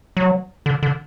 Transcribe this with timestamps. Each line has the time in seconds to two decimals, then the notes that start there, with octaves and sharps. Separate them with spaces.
0.17 F#3
0.66 D3
0.83 D3